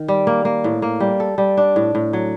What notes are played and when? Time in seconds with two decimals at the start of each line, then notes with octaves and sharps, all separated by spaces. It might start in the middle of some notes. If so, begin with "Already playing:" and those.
Already playing: D#3
0.08 G3
0.27 A#3
0.45 A#3
0.64 A2
0.82 A#3
1.00 G3
1.20 A4
1.38 G3
1.57 D4
1.76 A2
1.95 A2
2.13 F#3